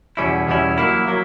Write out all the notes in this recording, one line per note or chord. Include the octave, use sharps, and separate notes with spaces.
E2 B2 G3 C#4 E4
E2 B2 G3 C#4 E4
F#3 A#3 E4
F#3 A#3 E4